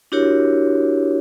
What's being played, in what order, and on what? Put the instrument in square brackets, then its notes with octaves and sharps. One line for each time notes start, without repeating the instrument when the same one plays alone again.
[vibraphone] D4 E4 F#4 G4 A#4 C#5